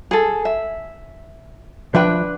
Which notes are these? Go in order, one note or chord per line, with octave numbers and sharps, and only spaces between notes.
G#4 A4
E5
F3 D4 B4 E5 G5